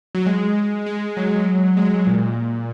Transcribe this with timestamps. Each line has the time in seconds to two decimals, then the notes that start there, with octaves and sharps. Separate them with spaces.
0.15 F#3
0.27 G#3
0.86 G#3
1.17 F#3
1.77 G#3
2.07 A#2